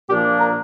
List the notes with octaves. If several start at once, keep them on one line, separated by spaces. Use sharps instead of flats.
A#2 F3 A#3 D4 G4
A#4